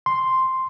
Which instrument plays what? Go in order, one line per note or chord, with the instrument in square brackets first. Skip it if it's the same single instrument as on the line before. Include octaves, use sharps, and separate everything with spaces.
[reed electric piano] C6